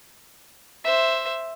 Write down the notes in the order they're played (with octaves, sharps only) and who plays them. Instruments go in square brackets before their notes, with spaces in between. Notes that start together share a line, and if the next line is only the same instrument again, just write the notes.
[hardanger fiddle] C5 E5